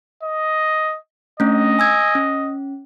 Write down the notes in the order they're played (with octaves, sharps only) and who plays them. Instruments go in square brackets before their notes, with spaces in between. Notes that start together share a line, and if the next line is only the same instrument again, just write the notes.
[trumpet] D#5
[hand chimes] A3 C#4 D4 [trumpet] D#5
[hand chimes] G#5 E6 G#6
C#4